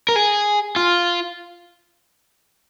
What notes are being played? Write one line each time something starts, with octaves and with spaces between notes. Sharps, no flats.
A#4
G#4
F4